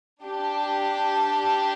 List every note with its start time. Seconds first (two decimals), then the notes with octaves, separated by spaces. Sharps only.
0.24 D4 G4